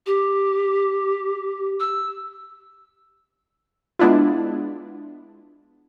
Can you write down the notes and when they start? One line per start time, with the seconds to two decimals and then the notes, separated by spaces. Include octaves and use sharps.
0.06 G4
1.80 E6
3.99 G#3 B3 D4 E4 F4